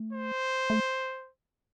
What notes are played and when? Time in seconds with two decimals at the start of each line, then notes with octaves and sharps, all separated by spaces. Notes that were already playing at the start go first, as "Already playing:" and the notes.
Already playing: A3
0.13 C5
0.70 A3